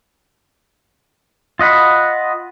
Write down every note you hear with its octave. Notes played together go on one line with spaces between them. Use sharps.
F4 D#5 F#5 B5